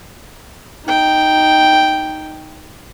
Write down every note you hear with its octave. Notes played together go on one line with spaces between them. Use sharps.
D#4 G5